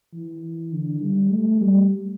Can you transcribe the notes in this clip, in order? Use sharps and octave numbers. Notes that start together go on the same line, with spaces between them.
E3
D3
G3
A3
G3